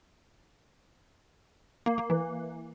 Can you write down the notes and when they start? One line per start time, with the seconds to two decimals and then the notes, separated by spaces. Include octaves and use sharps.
1.86 A#3
1.98 A#3
2.10 E3